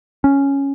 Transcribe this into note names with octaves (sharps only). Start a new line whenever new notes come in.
C#4